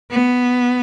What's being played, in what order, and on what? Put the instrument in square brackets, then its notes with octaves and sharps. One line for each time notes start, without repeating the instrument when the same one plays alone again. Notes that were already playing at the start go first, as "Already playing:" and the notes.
[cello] B3